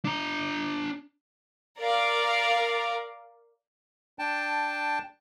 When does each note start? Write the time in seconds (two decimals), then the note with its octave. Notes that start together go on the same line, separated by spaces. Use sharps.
0.05 D4 A#5
1.79 A#4 D5 F5
4.19 D4 G5 A5